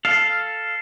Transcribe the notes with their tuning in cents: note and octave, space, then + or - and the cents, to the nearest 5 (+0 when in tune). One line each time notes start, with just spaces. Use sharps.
A4 +0 F5 +0